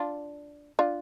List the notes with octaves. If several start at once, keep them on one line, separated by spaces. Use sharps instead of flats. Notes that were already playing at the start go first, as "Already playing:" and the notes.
Already playing: D4 F4
D4 F4